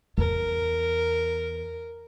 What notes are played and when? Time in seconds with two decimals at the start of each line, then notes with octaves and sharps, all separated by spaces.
0.18 E2 A#4